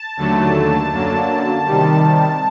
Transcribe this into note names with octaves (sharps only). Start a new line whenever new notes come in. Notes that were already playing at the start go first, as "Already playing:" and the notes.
Already playing: A5
D#2 D3 F#3 A3
F#2 D3 F#3 A#3
C3 D#3 G3